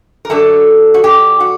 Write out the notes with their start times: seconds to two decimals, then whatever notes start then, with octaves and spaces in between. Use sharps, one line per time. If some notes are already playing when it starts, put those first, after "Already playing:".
0.25 A#4
0.30 F#2 D3 F#3 A4
0.94 F#4
1.04 G4
1.40 F#4